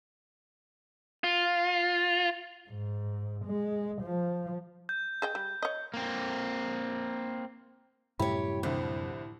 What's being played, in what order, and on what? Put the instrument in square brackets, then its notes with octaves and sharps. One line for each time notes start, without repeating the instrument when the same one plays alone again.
[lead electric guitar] F4
[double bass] G#2
G#3
F3
[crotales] G6
[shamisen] G#4 D#5 G5
G3
C#5 D#5
[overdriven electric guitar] A#3 C4
[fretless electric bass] F#2 C3 G3 [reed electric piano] A2 E4 B5 [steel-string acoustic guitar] G4 C#5
[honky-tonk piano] C2 D3 [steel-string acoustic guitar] F2